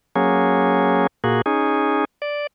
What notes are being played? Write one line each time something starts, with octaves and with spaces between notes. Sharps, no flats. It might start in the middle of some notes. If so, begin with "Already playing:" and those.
F#3 A#3 C#4 G#4
A#2 A#3 F#4 G#4
C#4 D#4 G#4
D5